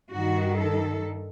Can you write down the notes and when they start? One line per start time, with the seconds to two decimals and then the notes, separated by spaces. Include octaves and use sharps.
0.10 G2 D#3 F#4
0.56 A4